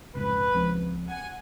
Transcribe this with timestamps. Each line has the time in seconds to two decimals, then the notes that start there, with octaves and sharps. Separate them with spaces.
0.15 F1 C#2 G#2 B4
0.54 C#2 F3 C4
1.07 F#5 G#5